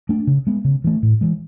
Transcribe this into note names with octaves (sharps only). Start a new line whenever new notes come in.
A3 D4
C#3
G#3 B3
C#3
E3 A3
A2
E3 G#3